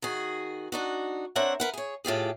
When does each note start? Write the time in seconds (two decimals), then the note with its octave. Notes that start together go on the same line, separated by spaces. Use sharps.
0.02 D#3 F#4 G#4
0.72 D4 D#4 F#4
1.36 C4 D4 A#4 C#5 E5 F#5
1.60 A#4 B4 F#5
1.74 G#4 C#5
2.05 A2 F4 G4 G#4